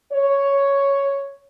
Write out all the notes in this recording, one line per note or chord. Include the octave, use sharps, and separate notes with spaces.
C#5